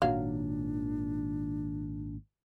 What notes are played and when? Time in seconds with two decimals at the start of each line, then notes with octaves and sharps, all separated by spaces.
0.02 G#1 A#2 D#3 F#3 D4 F5